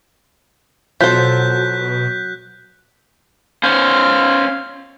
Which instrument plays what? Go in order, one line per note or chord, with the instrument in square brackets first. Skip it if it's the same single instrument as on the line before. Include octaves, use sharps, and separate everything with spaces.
[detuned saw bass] B2 [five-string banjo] F3 C5 [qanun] F#3 A4 [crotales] F#6 G6 B6
[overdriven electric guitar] C#4 C5 [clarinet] F5